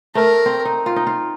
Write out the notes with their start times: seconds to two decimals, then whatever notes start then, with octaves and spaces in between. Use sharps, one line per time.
0.15 A3 A#4
0.46 C4
0.65 D#4
0.86 F4
0.96 D#4
1.07 F4